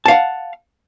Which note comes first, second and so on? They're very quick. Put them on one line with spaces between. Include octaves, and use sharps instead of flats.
A5 F5 F#5